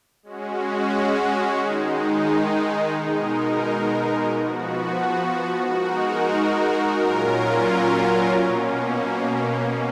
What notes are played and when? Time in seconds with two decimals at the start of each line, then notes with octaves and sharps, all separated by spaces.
0.23 G#3 C#4 F#4
1.58 D#3 G#3 D#4
2.92 B2 G#3 D#4 A#4
4.27 F3 B3 F#4
5.62 G#3 D#4 F#4 A#4
6.97 A#2 F#3 C#4 F4 A#4
8.32 B2 A#3 C#4